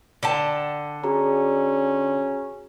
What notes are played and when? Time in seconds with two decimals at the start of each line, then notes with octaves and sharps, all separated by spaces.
0.23 D3 G5 A5
1.04 C#4 F#4 G#4 A#5